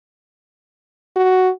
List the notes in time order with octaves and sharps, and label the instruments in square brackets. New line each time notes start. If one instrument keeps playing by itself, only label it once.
[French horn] F#4